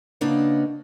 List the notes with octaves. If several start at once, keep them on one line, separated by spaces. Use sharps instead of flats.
C#3 A#3 D4 D#4 B4 F#5